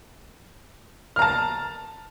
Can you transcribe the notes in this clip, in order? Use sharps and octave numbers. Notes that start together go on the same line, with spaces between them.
A5 A#5 F6